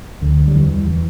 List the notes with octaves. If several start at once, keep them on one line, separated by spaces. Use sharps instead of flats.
D2 D3
G3
E2 E3
E3